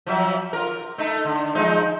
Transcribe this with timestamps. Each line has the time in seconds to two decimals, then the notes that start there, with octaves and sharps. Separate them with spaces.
0.07 F3 F#3 E5
0.53 F4 A#4
0.98 A3 D#4
1.25 D3
1.55 F3 G#3 D#4